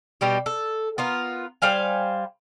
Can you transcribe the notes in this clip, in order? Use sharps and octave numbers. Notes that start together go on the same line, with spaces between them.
B2 G3 G4
A4
B3 F4 A#4
G3 C5 F5 G#5